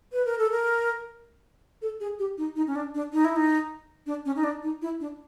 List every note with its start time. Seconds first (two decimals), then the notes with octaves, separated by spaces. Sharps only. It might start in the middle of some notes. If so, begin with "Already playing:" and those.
0.13 B4
0.25 A#4
0.38 A4
0.51 A#4
1.82 A4
2.00 G#4
2.19 G4
2.38 D#4
2.56 D#4
2.67 C#4
2.75 D4
2.95 D4
3.13 D#4
3.25 E4
3.36 D#4
4.06 D4
4.25 C#4
4.36 D#4
4.44 D4
4.63 D#4
4.82 E4
5.00 D4